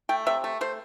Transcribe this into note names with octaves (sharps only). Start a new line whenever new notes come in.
A3 G5
C3 E5
A3
A3 C5